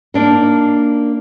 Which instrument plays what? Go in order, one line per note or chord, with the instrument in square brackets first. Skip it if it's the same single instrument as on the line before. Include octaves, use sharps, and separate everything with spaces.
[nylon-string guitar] A#3 D4 D#4